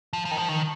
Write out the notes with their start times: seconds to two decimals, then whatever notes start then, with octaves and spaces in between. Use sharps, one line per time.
0.13 F3
0.25 F3
0.31 D#3
0.37 F3
0.49 D#3